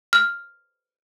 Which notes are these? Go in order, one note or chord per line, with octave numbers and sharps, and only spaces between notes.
F6